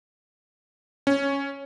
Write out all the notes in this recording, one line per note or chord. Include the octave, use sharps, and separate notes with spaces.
C#4